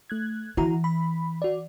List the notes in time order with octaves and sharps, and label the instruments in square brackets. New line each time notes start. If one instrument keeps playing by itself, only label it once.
[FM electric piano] A3 F#6 G#6
[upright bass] E3 [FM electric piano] E4 F#4 A#5
[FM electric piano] B5
F#4 D5